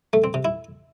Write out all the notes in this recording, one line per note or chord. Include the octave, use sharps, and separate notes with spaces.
A3
C4
C3
E4